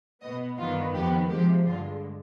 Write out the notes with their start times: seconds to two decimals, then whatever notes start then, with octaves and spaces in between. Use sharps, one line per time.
0.22 B2 B3 D#5
0.58 G2 D#3 B3 F4
0.94 F2 D#3 B3 G4
1.30 C3 F3 G#3 G4
1.66 G2 D3 G#3 F4